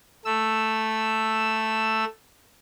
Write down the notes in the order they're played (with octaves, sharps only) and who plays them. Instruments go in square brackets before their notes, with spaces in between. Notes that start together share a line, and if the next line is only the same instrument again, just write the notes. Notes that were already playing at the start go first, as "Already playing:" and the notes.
[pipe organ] A3 E6